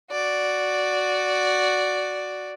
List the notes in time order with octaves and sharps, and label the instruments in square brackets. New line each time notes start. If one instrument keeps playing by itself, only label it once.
[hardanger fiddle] F#4 D5